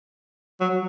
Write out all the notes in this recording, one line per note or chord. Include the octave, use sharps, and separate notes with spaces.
F#3